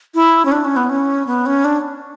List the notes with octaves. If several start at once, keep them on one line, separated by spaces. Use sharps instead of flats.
E4
C#4
D4
C#4
B3
C#4
B3
C#4
D4